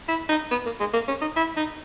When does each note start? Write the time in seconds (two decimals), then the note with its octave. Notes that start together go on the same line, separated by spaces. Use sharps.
0.08 E4
0.29 D#4
0.51 B3
0.66 A#3
0.80 G#3
0.94 A#3
1.08 C#4
1.21 D#4
1.36 E4
1.57 D#4